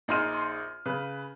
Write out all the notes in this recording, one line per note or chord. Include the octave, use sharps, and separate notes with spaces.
A#1 D#4 G#4 C6 F6 D#7
C#3 B4